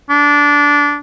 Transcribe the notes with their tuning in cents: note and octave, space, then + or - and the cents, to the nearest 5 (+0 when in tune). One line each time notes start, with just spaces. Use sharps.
D4 -15